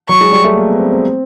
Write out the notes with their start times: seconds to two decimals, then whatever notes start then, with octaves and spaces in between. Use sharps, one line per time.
0.09 F#3 C#6
0.21 G#3
0.32 G3
0.44 A3
0.56 A#3
0.68 B3
0.79 C4
0.91 C4